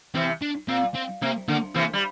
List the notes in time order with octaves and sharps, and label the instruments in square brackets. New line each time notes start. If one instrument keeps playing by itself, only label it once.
[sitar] C3 E3 [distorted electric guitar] C4
[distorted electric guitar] D4
[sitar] A#2 [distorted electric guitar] C4
[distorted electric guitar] C4
[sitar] C3 [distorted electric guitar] A#3
[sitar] D3 [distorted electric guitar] A#3
[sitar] C3 E3 [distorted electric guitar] A#3
[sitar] G3